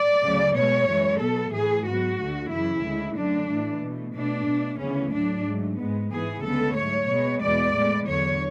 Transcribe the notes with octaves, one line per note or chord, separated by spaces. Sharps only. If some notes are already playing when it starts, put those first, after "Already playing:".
Already playing: D5
D2 C#3 F#3
B2 G#3 B3 C#5
F#2 E3 G#3
B2 F#3 B3 A4
A2 E3 A3 G#4
G#2 F#3 B3 F#4
D2 D3 A3
F#2 C#3 E3 E4
D2 C#3 G#3
F#2 D3 A3 D4
A2 E3 A3
B2 A3
B2 A3 D4
B2 A3
D2 C#3 E3 B3 C#4
A2 F#3 A3 D4
G#2 F#3 A3
G#2 G#3 B3
G#2 E3 B3 G#4
D2 C#3 G#3 B3 A4
G#2 F#3 A3 C#5
B2 G#3 B3
E2 B2 G#3 B3 D5
A2 G#3 B3
E2 D3 F#3 C#5